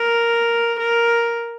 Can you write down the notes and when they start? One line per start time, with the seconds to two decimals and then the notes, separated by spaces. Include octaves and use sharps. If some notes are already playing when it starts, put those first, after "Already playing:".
Already playing: A#4
0.79 A#4